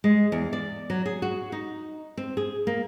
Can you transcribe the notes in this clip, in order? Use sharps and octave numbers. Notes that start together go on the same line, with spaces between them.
G#3
E2
D5
F#3
G#4
F#4
D#4
C4
G#4
A#3